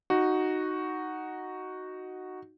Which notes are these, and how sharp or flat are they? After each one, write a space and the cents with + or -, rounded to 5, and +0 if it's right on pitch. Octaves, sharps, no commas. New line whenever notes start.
D#4 +0 F#4 +0